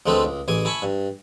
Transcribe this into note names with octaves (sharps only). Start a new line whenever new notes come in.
D2 G#3 A3 C4 A4 B4
C#2
A1 E3 G#4 G#5
E4 G#5 A5 B5 C#6
G2